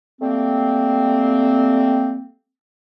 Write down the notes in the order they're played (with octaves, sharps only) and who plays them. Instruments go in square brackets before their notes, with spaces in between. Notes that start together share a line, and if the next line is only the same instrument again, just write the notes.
[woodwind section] G3 A3 A#3 C4